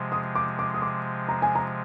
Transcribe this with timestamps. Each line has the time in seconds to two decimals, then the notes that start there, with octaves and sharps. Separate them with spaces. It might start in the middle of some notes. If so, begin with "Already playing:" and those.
Already playing: C3 F3 G#3
0.12 D#6
0.35 D6
0.59 D6
0.74 D#6
0.82 D6
1.29 A#5
1.42 G#5
1.55 A#5